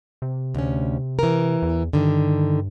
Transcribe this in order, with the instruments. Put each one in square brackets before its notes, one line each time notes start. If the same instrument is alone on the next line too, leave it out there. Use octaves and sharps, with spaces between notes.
[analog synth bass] C3
[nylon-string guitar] D2 C#4
E3 A#4
[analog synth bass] E2
[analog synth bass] G2 [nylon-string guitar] D3 D#3